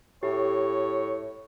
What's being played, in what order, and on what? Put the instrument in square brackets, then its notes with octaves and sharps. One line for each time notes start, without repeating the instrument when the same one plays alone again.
[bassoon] A2 [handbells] G4 [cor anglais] C#5